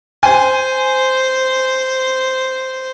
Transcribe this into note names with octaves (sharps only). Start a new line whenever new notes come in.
C5 G#5